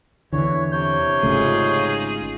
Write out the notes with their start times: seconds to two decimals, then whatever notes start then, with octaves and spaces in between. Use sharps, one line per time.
0.33 E2 D3 E3 C#5
0.72 C3 C#5 G6
1.23 G#1 C#3 A3 D#4 F4 G#4